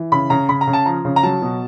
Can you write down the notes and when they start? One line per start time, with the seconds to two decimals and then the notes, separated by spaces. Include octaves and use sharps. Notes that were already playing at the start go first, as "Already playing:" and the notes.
Already playing: E3
0.12 C#3 B5
0.30 C#3 A#5
0.49 C#3 B5
0.61 A#5
0.67 C#3
0.73 A5
0.86 F3 A#5
1.05 C#3
1.16 A#5
1.23 F#3 A5
1.42 B2